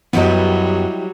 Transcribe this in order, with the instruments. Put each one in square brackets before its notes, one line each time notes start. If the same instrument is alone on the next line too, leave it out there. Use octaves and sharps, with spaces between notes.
[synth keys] F#2 B3 [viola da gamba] F#3 G3 [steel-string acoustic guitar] E4 G4 D#5